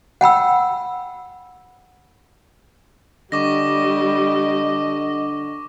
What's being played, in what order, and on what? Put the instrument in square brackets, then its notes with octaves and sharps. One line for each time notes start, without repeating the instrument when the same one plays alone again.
[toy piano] F#5 G5 B5 E6
[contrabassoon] D3 [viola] G3 [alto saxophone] D#5 [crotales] C#6 D6 A#6